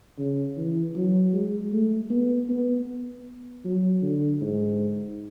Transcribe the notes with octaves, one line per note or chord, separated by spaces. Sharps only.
C#3
E3
F#3
G#3
A3
B3
B3
F#3
D3
G#2